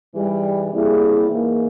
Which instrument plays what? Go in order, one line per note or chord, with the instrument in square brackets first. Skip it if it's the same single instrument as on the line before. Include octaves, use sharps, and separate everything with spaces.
[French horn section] G#2 E3 G3
C3 G3 A#3 E4 G#4
G#2 E3 A#3